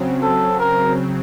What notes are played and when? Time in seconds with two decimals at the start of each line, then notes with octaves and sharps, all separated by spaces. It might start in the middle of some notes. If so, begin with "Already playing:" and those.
Already playing: C#3 F#3 C4
0.22 A4
0.60 A#4